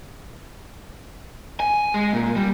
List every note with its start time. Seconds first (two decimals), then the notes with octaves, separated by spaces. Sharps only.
1.60 G#5
1.94 G#3
2.13 A#2
2.36 G3